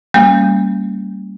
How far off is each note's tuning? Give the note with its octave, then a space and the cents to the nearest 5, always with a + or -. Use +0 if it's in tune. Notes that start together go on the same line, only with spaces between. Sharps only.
G3 +0 A#3 -30 C#4 +0